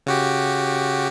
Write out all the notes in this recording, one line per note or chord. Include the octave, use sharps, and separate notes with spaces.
C#3 F#4 G4